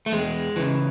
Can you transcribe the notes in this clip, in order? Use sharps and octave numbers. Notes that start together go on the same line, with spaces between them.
A3
E2 G#3
C#3 E3